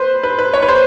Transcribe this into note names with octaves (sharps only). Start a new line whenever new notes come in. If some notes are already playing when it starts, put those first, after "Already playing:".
Already playing: B4 C5
B4
B4
C#5
B4
C5